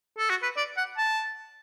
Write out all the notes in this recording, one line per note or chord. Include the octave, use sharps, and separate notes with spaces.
A4
F#4
B4
D5
F#5
A5